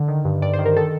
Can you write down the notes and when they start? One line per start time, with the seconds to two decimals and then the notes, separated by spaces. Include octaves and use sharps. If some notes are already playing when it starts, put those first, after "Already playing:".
Already playing: D3
0.08 D#3
0.25 G2
0.42 G2 D5
0.54 C5
0.59 D#3
0.66 A#4
0.76 D#3 A4